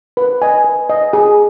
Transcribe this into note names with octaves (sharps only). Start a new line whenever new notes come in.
B4
D#5 G#5
B4
D#5 G#5
G#4